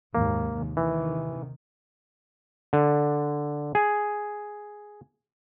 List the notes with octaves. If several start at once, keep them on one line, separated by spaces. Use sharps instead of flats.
D#2 G#2 C3 A#3
C3 D#3 E3
D3
G#4